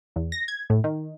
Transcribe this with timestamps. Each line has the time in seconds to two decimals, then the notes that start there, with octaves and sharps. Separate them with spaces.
0.16 E2
0.32 A#6
0.48 G#6
0.70 A2
0.84 D#3